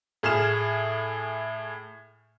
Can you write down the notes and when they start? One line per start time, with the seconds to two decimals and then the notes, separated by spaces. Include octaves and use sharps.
0.23 A2 G#4 F6 E7